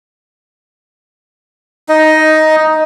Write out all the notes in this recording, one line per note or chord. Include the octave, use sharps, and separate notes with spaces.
D#4 D#5